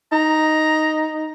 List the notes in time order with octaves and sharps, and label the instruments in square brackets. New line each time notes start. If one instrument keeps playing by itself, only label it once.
[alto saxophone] D#4 [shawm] A#5